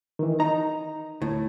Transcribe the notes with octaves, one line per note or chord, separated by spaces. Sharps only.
D#3 E3
D#4 A#5
D2 A2